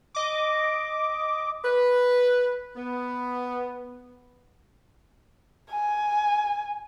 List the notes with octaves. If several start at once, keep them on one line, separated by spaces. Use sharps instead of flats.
D#5 D6
B4
B3
G#5